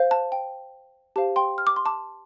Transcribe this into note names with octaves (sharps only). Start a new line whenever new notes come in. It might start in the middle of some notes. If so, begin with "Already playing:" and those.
Already playing: C5 F5
A5
G5
G4 C5 F5 A5
G5 C6
F6
D6
C6
A5 D6